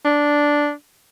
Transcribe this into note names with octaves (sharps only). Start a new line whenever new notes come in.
D4